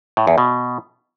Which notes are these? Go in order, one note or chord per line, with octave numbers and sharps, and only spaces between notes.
A2
E2
B2